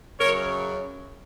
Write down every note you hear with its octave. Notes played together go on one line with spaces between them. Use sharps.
F#2 C#3 F#3 A#4 C#5